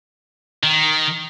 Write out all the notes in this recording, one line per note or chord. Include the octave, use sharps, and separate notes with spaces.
D#3